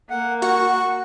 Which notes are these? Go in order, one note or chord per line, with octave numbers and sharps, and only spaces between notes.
A#3 F#5
F#4 F#5 C#6